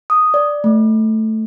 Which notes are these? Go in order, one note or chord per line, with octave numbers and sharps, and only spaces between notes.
D#6
D5
A3